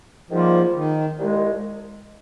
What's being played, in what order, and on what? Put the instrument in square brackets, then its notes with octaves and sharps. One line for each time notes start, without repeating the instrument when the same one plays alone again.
[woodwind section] G#2 D#3 G3 A#3 F4 [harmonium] F3
[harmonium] D#3
[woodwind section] C2 A#2 G#3